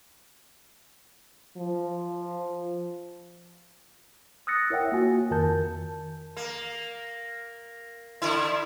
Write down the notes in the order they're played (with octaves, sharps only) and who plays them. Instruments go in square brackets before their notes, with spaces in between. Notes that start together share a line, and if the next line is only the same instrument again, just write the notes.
[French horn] F3
[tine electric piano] D#6 E6 F#6 A6 A#6 C#7
E4 A#4 C#5 E5 F#5 G5
A#3 F4 F#4 G#5
F2 D#3 A#4 A5 G6
[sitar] A#3
D3 E4